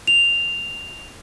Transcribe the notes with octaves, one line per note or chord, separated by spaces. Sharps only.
F7